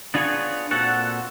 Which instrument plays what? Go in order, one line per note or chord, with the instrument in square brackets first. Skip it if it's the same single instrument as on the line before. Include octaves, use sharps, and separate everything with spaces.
[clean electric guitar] B3 D4 F4 G#4 B4 C#5
A#2 C4 F#4 A4 F#5